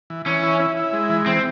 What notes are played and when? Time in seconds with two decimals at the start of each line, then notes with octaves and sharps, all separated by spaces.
0.10 E3
0.26 E3 C#4
0.43 E4
0.60 E4
0.77 E4
0.93 G#3
1.09 E3
1.26 E3 C4